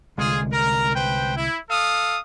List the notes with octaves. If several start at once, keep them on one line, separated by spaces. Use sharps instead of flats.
C2 D3 G#3 F4 G#4
A#4
B4 C5 G5
E4
A4 F5 D#6